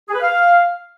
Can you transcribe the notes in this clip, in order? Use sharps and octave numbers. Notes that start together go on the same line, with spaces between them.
G#4
B4
F5